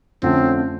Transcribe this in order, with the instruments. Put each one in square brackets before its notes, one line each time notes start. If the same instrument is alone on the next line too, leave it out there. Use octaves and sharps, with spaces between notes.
[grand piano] F2 D3 F3 A3 C#4 [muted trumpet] C4